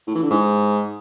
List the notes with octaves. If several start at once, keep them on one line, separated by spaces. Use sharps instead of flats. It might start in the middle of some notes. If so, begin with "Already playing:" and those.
A2
E3
D3
G#2